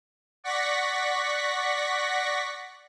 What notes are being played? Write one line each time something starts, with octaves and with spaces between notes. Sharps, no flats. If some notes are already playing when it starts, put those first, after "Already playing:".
D5 F#5 C#6 A#6 B6